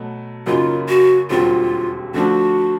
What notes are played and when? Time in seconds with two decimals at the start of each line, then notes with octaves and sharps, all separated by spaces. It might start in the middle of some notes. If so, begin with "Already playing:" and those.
Already playing: B2 F#3 A3
0.46 F#2 C#3 F#3 A#3 D#4 F4
0.88 F#4
1.30 E1 D#2 D3 G3 C4 F4
2.14 D3 F3 A3 D4 F#4